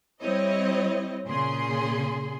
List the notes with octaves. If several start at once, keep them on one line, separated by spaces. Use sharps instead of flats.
G3 C4 E4 C#5 D#5
A#2 C#3 G#4 C6